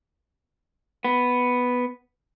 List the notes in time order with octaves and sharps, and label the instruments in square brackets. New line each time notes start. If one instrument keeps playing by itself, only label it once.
[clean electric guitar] B3